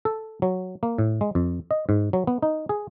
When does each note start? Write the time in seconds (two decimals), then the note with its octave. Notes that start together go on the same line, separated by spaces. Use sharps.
0.05 A4
0.42 F#3
0.83 A#3
0.98 A2
1.21 G#3
1.35 F2
1.71 D#5
1.89 G#2
2.13 F#3
2.27 B3
2.42 D#4
2.69 G#4